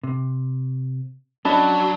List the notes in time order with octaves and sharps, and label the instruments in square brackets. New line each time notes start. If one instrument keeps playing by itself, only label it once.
[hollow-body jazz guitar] C3
[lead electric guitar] F#3 [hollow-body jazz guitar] C#4 D#5 [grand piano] D4 B5 [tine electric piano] A5